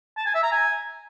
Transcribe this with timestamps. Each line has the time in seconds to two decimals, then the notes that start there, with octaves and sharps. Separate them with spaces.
0.18 A5
0.26 G#5
0.35 E5
0.44 A#5
0.52 G#5